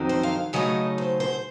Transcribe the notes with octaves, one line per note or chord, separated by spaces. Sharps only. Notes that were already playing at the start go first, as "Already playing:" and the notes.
Already playing: F2 D#3 F#3 C4 D#4
C5
F5
C#3 F#3 A3 D#4 D#5
C5
C5